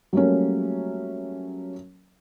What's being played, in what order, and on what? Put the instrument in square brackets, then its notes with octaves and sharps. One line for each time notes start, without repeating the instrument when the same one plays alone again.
[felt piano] F#3 G3 A3 A#3 C#4